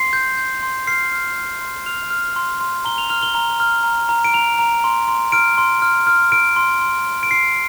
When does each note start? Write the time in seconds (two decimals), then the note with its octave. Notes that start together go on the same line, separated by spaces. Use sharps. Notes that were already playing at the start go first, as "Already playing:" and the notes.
Already playing: C6 C7
0.13 G6
0.37 G6
0.63 C6
0.87 F6 C7
1.13 F6
1.36 F6
1.62 C6
1.86 F6 F7
2.10 F6
2.36 C6
2.61 C6
2.85 A#5 G7
2.98 F7
3.10 F6 F7
3.23 G7
3.35 A#5
3.60 F6
3.84 A#5
4.09 A#5
4.25 D7
4.34 A#5 F7
4.59 A#5
4.84 C6
5.08 C6
5.32 F6 D7
5.58 C6
5.82 F6
6.07 F6
6.32 F6 D7
6.56 C6
6.81 C6
7.07 C6
7.23 D7
7.31 C6 C7